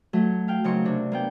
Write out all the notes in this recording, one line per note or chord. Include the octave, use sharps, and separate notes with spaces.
F#3 A3
F5 G5
C#3 F#3 A#3 C4 D#4 C#6
C3 D4
A#3 B3 G5